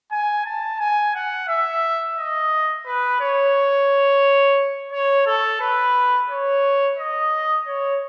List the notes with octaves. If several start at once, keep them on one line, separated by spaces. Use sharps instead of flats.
G#5
A5
G#5
F#5
E5
D#5
B4
C#5
C#5
A4
B4
C#5
D#5
C#5